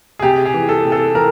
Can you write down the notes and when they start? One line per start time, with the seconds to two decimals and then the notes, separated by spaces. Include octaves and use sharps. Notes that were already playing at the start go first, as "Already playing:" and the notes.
0.19 G#4
0.22 C3 G4
0.45 G#4
0.54 E3
0.69 A4
0.85 C3
0.92 A4
1.14 E3 A#4